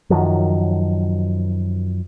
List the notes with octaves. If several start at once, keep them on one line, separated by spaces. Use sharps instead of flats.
F#2 D#3 F3 F#3